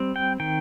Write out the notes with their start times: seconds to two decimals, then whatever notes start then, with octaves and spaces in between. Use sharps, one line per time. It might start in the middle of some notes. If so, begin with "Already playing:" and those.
Already playing: G3 C4
0.16 G5
0.40 D#3 G5